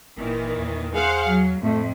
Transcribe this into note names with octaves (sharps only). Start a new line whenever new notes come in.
G1 A#2 D#3 E3
E2
G#4 C5 F5 F#5
F#3
F2 A2 A3